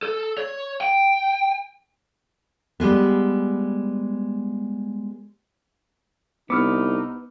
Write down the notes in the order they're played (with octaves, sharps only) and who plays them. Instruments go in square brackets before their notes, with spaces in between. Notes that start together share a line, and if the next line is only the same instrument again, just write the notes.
[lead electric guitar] A4
C#5
G5
[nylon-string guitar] G3 G#3 B3
[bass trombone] C2 [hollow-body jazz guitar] B3 [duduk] D#4 [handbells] D6 E6 F6